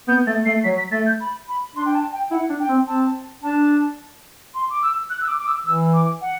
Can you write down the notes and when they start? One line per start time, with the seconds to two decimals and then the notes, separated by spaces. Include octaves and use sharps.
0.08 B3 G6
0.27 A3 A6
0.45 A3 C7
0.64 F#3 B6
0.78 B6
0.92 A3 A6
1.06 G6
1.20 B5
1.48 B5
1.75 D4 C6
1.86 G5
1.94 A5
2.12 G5
2.31 E4 F#5
2.49 D4
2.60 G5
2.69 C4
2.87 C4 A5
3.43 D4 A5
4.54 C6
4.70 D6
4.82 E6
5.10 F#6
5.21 E6
5.28 D6
5.38 D6
5.47 E6
5.65 E3 E6
5.93 D6
6.21 F#5